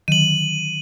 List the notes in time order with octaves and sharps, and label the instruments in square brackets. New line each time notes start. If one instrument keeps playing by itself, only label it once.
[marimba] D3 D#3 F#3 [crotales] D#7 F#7